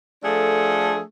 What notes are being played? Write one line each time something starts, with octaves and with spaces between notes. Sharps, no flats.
F3 A3 D4 G#4 A4